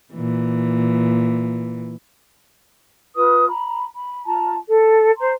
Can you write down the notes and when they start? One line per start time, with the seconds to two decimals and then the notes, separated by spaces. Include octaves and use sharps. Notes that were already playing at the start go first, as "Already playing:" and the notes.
0.14 A#2 E3
3.15 F4 B4 D#6
3.48 A#5 B5
3.95 B5
4.25 F4 A5 A#5
4.66 A4
5.18 C5 A#5 C6